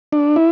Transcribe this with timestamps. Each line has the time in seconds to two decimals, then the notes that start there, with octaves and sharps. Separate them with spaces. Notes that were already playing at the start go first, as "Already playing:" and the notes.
0.12 D4
0.36 E4